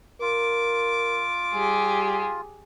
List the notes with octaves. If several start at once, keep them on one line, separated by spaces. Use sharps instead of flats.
F4 A#4 D6
G3 G4 G#4